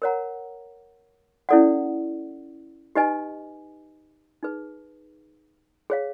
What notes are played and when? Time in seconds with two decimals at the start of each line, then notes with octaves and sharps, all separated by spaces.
0.02 A#4 C#5 F#5 A#5
1.49 C#4 E4 A4 D5 F#5
2.95 D#4 G4 B4 D#5 G#5
4.43 D#4 G#4 B4
5.90 G#4 C#5 F5